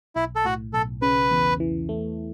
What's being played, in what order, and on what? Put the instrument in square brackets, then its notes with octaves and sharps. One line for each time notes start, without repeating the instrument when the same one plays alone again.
[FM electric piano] B1 [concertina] E4
[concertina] A4
[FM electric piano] A2 [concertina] F#4
[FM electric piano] B1 [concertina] A4
[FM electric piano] C#3 [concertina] B4
[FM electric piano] E2
E3
A3